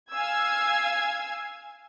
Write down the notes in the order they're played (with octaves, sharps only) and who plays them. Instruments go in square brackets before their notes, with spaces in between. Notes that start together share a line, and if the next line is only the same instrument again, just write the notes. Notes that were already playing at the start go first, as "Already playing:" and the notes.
[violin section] F5 G#5 E6 G#6